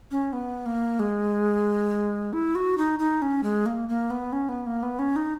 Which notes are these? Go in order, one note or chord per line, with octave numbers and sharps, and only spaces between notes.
C#4
B3
A#3
G#3
E4
F#4
D#4
D#4
C#4
G#3
A#3
A#3
B3
C#4
B3
A#3
B3
C#4
D#4